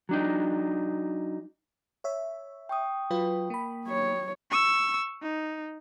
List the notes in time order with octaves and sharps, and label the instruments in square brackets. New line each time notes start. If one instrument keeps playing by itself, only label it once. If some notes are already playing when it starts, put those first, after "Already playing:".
[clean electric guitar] F#3 D4 D#4
[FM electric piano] C#5 E5
[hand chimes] G5 C#6 D#6
[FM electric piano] F#3 F4 B4
A#3 B5
[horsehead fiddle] F#3 C#5
[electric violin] C#6 E6
D#4